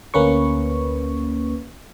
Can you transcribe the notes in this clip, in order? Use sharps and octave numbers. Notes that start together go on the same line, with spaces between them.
D2 A#3 C#4 B4 C#6